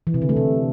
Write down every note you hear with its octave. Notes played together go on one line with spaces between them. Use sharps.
E3
C3
D3
A3
C3